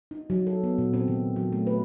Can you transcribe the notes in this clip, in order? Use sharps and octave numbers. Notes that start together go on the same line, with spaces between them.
D#4
F#3
A4
B3
A#2
C4
D#3
F#3
A3
B4